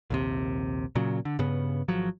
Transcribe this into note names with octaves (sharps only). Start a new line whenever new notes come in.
A#1 D#2 C3
A#2 C#3 F#3
D3
G2 C#3 B3
G#1 F3 F#3